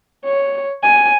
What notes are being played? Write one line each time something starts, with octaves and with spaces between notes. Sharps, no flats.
C#5
G#5